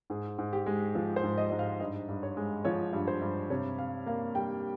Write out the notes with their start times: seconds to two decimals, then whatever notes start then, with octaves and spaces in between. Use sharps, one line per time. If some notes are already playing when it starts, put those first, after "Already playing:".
0.10 G#2 G#4
0.38 G#2
0.53 G4
0.66 G#3
0.95 F3
1.16 C5
1.23 G#2
1.38 D#5
1.50 G#2 D#5
1.59 F5
1.80 G2 D#5
2.09 G2
2.23 C#5
2.37 G#3
2.65 F3 C#5
2.93 G2
3.07 C5
3.22 G2
3.50 C3 C#5
3.79 C3 F5
4.06 A#3 F5
4.35 G3 G5